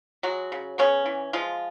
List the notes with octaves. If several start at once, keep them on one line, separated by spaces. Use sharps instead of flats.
F#3 G#3 F#4
C#3
C#3 B3 C#4
E3
F3 G#3 F4